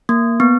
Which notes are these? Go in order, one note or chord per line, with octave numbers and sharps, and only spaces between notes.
A#3
B3